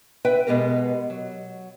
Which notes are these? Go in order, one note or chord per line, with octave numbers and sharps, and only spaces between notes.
B4 E5 G5
B2 G#3 B3 G4 A#4
F#3